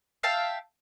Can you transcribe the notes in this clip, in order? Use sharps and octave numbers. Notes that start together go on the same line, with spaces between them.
E5 F5 G5 A5